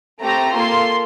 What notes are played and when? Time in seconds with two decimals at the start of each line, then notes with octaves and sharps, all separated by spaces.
0.22 A3 C4 G4 A#5
0.55 A#3 F4 A4 C6